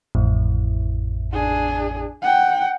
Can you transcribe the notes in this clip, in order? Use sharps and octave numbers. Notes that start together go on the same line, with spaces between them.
A1 F2 A2
D4 G#4
F#5 G5